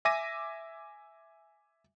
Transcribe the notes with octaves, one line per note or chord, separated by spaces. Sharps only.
E5 G#5 D6 A#6 D#7